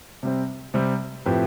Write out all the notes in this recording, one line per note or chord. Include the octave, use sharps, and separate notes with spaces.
C3 G3 C4
C3 G3 C4
A2 F3 C4 G4 B4